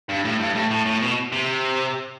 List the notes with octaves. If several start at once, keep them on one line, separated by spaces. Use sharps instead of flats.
G2
A2
G2
A2
A2
A2
B2
C3